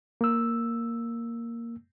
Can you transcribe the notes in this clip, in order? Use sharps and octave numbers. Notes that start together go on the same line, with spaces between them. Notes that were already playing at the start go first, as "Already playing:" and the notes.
A#3 E6